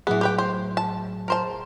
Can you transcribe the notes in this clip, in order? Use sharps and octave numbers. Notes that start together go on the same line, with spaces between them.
A2 E3 F#3 B3 G#4
G4 B4 G5
C5
A5
A#4 C5 A5